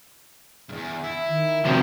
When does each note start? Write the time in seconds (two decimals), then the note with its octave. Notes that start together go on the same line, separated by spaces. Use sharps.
0.69 E2 G2
1.04 E4
1.27 D#3
1.66 F2 C3 F#4 A#4 D5